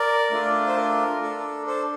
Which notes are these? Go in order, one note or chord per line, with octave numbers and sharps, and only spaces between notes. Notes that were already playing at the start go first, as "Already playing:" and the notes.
Already playing: A#4 D5
A3 D4 F4
C5
A#4
D4 A4
A4 C5